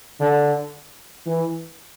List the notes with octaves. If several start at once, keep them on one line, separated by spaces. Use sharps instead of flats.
D3
E3